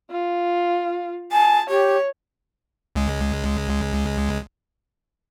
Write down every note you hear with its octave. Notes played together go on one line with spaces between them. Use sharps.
F4
G#5 A5
G4 C#5
C#2 G#3